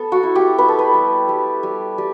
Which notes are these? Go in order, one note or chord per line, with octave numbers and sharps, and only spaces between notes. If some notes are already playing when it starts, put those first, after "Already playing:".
Already playing: B3 A4
F#4
E4
G4
B3 B4
A4
B4
G3
G3
G3
G3